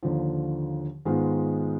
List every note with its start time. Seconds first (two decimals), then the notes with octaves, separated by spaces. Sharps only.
0.03 D#2 D3 F3
1.05 G#2 D#3 G#3 B3 F4